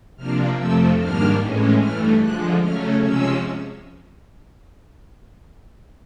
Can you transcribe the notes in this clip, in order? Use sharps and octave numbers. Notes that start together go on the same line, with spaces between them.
C3 F3 A#3 D4 F6
F2 C3 F3 A3 C4 E6
G#2 D#3 G3 A#3 D4 F6
A2 E3 G#3 C#4
G2 E3 A3 F6
D3 F3 G#3 F#6
C#3 F#3 A3 C#4 F6
C3 F3 G#3 C#4 E6